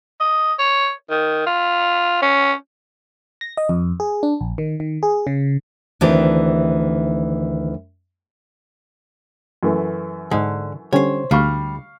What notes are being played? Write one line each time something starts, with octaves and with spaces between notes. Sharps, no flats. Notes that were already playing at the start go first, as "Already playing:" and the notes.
D#5
C#5
D#3
F4
C#4
A#6
D#5
F2
G#4
D4
A#1
D#3
D#3
G#4
C#3
D2 D#3 E3 C4 D4 G4
F#2 E3 A3
G#2 D3 G#3 G#4
D3 G3 C#4 C5 C#5
D2 G3 F5 C#6 F6